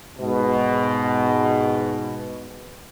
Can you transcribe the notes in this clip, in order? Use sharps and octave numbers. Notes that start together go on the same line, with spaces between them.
G#2 B2